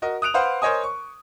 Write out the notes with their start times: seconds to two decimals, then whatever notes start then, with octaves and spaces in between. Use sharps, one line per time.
0.02 F#4 A#4 D#5
0.22 D#6 F#6 D7 F7
0.34 B4 C5 F5 F#5
0.62 A#4 C5 C#5 D#5 G#5 D#6
0.84 C#6